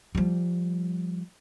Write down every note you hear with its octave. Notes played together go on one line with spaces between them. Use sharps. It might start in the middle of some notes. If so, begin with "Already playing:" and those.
F3 G3